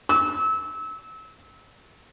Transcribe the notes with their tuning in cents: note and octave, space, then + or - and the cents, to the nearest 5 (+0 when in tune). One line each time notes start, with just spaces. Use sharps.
E6 -30